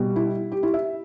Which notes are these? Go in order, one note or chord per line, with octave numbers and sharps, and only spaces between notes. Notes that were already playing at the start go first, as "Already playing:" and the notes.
Already playing: B2 G3
E4
G4
E4
E5